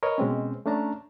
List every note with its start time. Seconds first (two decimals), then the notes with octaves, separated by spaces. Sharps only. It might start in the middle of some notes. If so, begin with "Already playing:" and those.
0.03 A#4 B4 C#5 D#5
0.18 B2 G#3 C4 C#4
0.66 A3 C#4 D4 A5 A#5